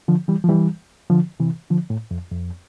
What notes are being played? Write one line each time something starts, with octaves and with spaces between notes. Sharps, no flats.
D3 F3
E3 G3
F3
E3 G3
D3 F3
C3 E3
D3 F3
A2
F2
F2